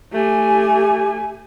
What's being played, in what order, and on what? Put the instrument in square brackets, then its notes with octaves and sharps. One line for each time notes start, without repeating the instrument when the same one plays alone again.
[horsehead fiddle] A3 G#5 [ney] G4